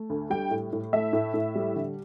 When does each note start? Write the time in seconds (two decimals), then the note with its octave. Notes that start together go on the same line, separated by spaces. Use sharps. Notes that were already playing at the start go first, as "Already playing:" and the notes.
Already playing: A3
0.10 D2
0.30 G3 G5
0.51 A2
0.73 A2
0.93 A3 E5
1.13 A2
1.34 A2
1.55 G3
1.75 D3